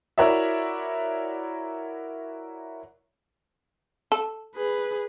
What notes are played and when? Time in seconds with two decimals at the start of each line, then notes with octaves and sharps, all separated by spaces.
0.18 E4 F#4 A#4 C#5 D5 E5
4.12 A4
4.56 G#4 B4